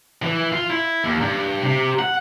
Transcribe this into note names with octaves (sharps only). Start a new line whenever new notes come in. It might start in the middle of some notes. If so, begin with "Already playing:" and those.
E3
F4
E4
D#2
G2
C3
F#5